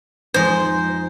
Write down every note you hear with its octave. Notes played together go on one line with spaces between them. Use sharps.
F2 G#3 D#4 C5